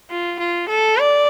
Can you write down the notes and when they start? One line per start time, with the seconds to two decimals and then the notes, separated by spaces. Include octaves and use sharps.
0.10 F4
0.39 F4
0.69 A4
0.98 D5